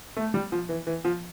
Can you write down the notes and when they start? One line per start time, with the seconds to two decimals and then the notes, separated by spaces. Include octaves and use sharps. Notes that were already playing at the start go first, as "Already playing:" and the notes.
0.16 A3
0.34 G3
0.52 F3
0.69 E3
0.87 E3
1.04 F3